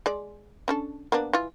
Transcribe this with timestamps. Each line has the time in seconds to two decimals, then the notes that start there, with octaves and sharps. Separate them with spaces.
0.06 G#3 D5
0.68 C#4 D4 A4
1.12 A#3 B3 D4
1.33 E3 F4